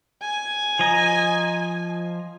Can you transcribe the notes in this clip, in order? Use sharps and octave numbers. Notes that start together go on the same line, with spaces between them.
G#5
F3 D#5 A#5